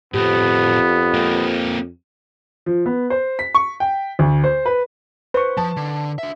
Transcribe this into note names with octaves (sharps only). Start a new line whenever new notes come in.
F2 A2 B3 C4 G4
A#3 C4
F3
B3
C5
B6
C#6
G5
D2
C5
B4
B4 C5 C#6
F3 A5
D3
D4 E5